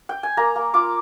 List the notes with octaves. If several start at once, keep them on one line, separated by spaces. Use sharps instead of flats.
G5
G#5
A#3 A#5
A#3
F4 D6